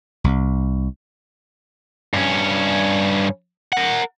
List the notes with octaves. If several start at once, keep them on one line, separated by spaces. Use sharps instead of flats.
C2
G2 C#4
A#4 F#5